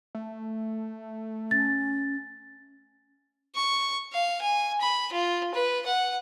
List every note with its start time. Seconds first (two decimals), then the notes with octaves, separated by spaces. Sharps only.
0.15 A3
1.51 C#4 A6
3.55 C#6
4.13 F5
4.41 G#5
4.81 B5
5.12 F4
5.54 B4
5.86 F#5